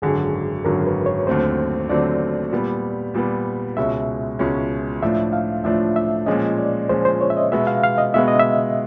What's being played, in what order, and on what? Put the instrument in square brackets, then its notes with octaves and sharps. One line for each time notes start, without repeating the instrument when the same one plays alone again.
[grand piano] G#1 F#2 D3 F#3 [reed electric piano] G#4
[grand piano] G#1 F#2 D3 F#3 [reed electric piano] A#4
[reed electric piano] B4
C#5
[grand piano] D#2 D3 F#3 A3 C4 [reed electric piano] C5
[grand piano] D#2 D3 F#3 A3 C4 [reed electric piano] D5
[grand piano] A#2 G3 B3
A#2 G3 B3
[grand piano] C#2 B2 G#3 C#4 [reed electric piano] E5
[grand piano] C#2 B2 G#3 C#4
[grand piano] A2 F3 A3 D4 F4 [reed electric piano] E5
[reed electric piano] F5
[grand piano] A2 F3 A3 D4 F4 [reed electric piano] E5
[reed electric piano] E5
[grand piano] A#2 F3 G#3 C#4 [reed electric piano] D#5
[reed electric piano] D5
[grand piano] A#2 F3 G#3 C#4 [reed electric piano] C5
[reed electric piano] C5
C#5
E5
D#5
[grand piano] B2 G#3 B3 [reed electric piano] E5
[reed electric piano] F5
F5
D#5
[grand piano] B2 G#3 B3 [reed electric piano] E5
[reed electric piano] D#5
E5